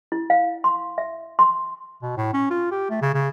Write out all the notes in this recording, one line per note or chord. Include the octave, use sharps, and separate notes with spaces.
E4
F5
C6
E5
C6
B2
A2
C#4
F4
G4
A3
C#3
C#3